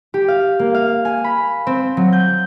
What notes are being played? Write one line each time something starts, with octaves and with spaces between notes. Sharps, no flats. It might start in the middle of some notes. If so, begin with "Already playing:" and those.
G4
F5
A#3
F5
G#5
B5
C4
F#3
G6